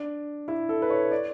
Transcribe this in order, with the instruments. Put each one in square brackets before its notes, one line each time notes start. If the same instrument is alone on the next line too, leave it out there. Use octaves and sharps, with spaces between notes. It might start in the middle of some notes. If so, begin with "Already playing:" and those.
Already playing: [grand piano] D4
E4
A4
B4
C#5
D5